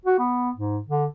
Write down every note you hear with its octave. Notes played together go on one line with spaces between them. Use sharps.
F#4
B3
G#2
D3